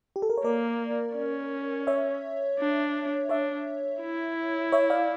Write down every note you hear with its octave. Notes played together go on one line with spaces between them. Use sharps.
G4
A4
A#4
C#5
A#3 A#4 D5
C#4
C#5 E5
D4
D4 C#5 E5
E4
C#5 E5
D5 F5